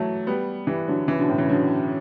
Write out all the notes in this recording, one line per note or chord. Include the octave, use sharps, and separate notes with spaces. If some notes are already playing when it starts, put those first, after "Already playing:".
Already playing: E3 F#3 A3
G3 B3
E3 G3
D3 F#3
C#3 E3
B2 D3
A2 C#3
C#3 E3
D3 F#3